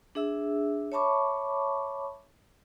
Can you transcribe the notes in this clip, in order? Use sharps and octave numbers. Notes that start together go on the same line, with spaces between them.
D4 G#4 E5 E6
C#5 E5 A5 B5 C#6 D6